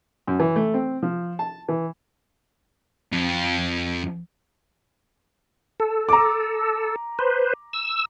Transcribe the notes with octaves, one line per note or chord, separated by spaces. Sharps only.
F#2
E3
A3
C4
F3
A5
E3
F2
A4
A#5 D6
B4 C5
E6